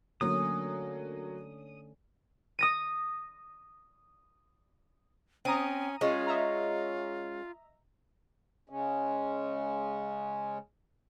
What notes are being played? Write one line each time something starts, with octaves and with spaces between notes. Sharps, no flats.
D3 F#3 A3 A#3 C#4 D#6
D#6 A#6 D#7
C4 C#4 A#5 D#6 D#7
G#3 C#4 F4
D#5 E5 A#5
C#3 G#3 C#4